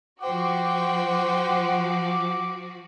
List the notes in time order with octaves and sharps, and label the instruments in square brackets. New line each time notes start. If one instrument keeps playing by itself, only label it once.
[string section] F3 F#4 [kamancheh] C5 G5 [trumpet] F#5 [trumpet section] D6